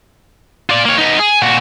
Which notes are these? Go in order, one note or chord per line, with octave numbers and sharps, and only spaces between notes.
F4 D5
A#3 C#5
B3 D#4
G#4
A#2 F#4